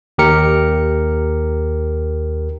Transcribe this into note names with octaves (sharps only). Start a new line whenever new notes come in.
D#2 G4 A#4 C#7